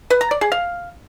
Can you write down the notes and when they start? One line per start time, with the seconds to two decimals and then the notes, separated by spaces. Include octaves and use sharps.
0.10 B4
0.21 A#5
0.31 D5
0.41 G#4
0.52 F5